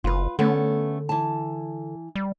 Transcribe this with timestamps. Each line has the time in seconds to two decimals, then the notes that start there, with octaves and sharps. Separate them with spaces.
0.04 F#1 F4 B4
0.39 D3 A3 B3 C#4
1.09 E3 A5
2.15 G3